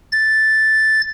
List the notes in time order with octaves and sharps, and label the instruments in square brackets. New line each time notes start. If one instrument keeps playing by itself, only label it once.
[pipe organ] A6